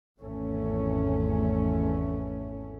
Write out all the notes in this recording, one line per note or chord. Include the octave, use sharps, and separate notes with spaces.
G#1 E2 A3 C#4